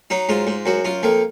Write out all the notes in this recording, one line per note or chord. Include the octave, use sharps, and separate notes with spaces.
F#3 D#4
G#2 F4
G#2
F#2 F#4
F#2 F4
F2 A#3